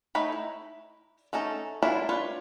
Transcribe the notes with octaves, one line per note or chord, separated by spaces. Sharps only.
A3 D#4 C#5 B5
E4
A3 C#4 D#4 A4
E3 F#3 D4 E4 F4
D4 F4 B4 C#5